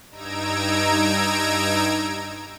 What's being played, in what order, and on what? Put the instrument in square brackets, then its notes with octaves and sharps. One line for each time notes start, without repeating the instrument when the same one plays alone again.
[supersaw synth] G2 D#4 A#5 E6 G#6 D7